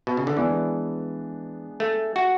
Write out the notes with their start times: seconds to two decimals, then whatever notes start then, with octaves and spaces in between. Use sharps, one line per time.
0.07 B2
0.17 C#3
0.27 D3
0.37 E3 G#3 B3 D4 G#4
1.80 A3
2.16 F#4